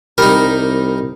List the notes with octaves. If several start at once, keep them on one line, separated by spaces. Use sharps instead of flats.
C2 G3 D#4 A#4